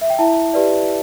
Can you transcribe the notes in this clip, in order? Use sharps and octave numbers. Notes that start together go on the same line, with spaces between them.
E5
G5
E4 E5 A5
G4 B4 D5